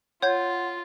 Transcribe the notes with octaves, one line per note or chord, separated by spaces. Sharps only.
F4 C#5 F#5 G6 G#6